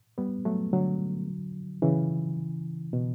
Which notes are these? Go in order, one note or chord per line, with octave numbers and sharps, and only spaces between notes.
G3 B3
F#3 A3
D3 F#3
C#3 E3
B2